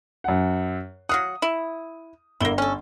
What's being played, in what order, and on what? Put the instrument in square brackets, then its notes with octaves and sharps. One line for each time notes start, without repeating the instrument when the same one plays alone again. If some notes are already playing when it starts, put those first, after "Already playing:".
[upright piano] F#2 F#5
[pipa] F#3 F5 F#5 [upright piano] D#6
[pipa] E4
[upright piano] G1 G7 [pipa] A#3 E4
[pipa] C#4 A4